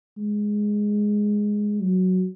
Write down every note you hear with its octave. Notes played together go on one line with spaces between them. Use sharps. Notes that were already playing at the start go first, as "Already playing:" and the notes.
G#3
F#3